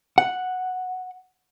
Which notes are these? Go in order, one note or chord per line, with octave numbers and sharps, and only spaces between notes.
F#5